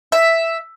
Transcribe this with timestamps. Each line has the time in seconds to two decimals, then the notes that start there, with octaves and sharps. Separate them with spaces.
0.12 E5